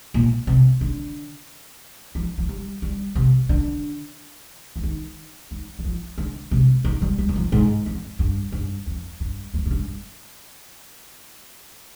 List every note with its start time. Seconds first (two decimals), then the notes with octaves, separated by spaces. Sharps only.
0.14 A#2
0.47 C3
0.81 D3
2.15 F3
2.38 F3
2.49 G3
2.82 G3
3.15 C3
3.49 D3
4.76 F3
4.84 D#3
5.51 D#3
5.79 G3
5.85 F3
6.18 D3
6.51 C3
6.85 D#3
7.02 G3
7.18 G3
7.29 D#3
7.36 F3
7.52 G#2
7.86 F2
8.19 G2
8.52 G2
8.86 F2
9.20 G2
9.54 F2
9.66 G#2
9.71 G2